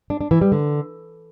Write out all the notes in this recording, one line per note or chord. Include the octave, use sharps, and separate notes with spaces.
D4
D4
E3
G3
D3